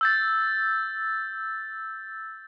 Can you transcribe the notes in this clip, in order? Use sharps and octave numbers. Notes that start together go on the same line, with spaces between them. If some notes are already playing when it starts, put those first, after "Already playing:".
E6 G6 A6